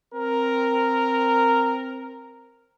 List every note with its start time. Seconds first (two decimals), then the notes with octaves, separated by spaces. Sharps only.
0.15 C4 A#4